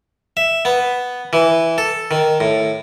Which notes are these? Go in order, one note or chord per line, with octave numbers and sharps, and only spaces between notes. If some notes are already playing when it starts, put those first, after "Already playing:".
E5
B3
E3
A4
D#3
A2